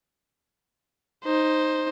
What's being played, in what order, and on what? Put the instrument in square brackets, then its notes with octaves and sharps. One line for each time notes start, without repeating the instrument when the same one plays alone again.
[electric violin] D#4 C5